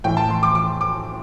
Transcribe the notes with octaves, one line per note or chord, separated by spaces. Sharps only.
A2 E3 G5
A5
C6
D6
D6
D6